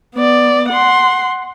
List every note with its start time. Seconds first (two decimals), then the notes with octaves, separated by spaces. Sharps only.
0.15 B3 D5
0.69 F#5 C6